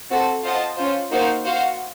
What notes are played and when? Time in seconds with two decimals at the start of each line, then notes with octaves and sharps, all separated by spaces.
0.10 C4 F#4 A4
0.43 F4 C5 D#5 F#5 A5
0.77 C#4 F4 C5
1.11 A#3 D#4 F#4 C5 F5
1.45 F#4 C5 F5